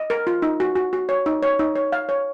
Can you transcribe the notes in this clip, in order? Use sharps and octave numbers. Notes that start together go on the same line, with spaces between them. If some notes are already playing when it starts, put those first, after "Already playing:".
Already playing: D#5
A#4
F4
D#4
F#4
F#4
F#4
C#5
D#4
C#5
D#4
C#5
F5
C#5